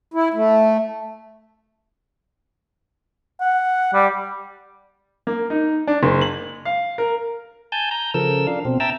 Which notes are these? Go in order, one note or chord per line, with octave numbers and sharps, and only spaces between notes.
E4
A3
F#5
G3
A#3
D#4
D4
F#1
F#7
F5
A#4
G#5 A5 G6
A#5 G6
C#3 F3 A4 A#4 E6
D4 F5
B2 C4
E5 G5 A5 A#5 E6